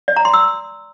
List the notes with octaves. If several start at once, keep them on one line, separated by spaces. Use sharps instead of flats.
D5
A#5
C6
E6